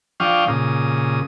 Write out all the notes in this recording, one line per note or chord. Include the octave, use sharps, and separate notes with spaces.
F3 D4 F5 G5 C#6 D#6
A#2 C#3 D#6